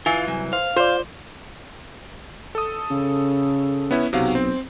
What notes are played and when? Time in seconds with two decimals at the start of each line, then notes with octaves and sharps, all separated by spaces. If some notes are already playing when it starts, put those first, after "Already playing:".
0.06 E3 F4 G#5
0.27 C2 F#3
0.53 C5 F5
0.76 F4 C5 D5
2.55 A4 D#6
2.91 C#3
3.91 B3 C#4 E4
4.13 B1 C3 F#3 F5
4.35 C4